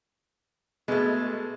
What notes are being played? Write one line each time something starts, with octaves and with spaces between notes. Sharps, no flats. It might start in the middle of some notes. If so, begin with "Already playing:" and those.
B2 G#3 A3